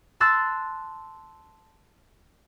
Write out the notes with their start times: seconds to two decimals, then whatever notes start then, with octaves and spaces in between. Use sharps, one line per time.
0.20 A5 C6 E6 F#6 A6